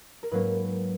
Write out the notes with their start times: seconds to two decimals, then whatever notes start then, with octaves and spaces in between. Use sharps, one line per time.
0.23 A#4
0.32 G#2 F#3 A#3 C#4 B4